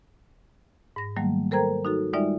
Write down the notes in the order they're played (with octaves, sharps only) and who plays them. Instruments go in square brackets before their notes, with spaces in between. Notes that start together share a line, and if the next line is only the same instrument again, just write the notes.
[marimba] G#2 A#6
D#3 F#3 G3 A3 A#3
A4 A#4 C5 G5 A#5 G#6
D#4 F#4 A4
G3 G#3 D#4 F4 D5 E5